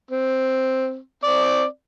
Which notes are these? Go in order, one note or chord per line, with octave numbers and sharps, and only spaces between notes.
C4
C4 D5